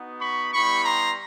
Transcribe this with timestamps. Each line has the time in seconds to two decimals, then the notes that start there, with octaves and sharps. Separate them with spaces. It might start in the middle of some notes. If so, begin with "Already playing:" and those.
Already playing: B3 D#4 F#4
0.21 B5 C#6
0.53 G3 B3 E4 G4 B5 C#6
0.85 A#5 C6